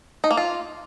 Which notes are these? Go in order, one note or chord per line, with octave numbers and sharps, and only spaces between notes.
D#4
A#3
F4